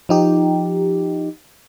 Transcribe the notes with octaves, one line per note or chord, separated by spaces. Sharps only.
F3 D#4 G4